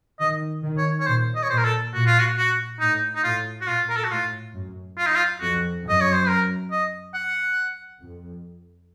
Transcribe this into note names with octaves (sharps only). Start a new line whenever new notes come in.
D#3 D#5
D#3
C#5
C#5
A#2 C5
D#5
C#5
A#2 C5
A#4
A4
A#2 F#4
F4
F#4
F#4
A2 D#4
D#4
A2 F4
F#4
A#2 F4
A#4
A4
F#4
A2 F4
F#2
F4
D#4
F4
F2 F#4
F#2 D#5
C#5
C5
A#4
D#5
F#5
F2